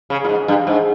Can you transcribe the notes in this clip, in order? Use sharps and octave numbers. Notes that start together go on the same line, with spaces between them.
C#3
A#2
G#2
G2
G#2